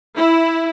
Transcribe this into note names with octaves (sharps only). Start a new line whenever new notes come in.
E4